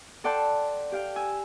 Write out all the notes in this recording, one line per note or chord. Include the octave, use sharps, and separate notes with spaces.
A4 D5 F#5 G5 A5 C6
G4 F5 G5
G#5 E6